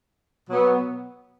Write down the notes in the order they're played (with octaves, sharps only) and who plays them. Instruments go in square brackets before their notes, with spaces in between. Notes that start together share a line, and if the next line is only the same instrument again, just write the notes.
[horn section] B2 F#3 B3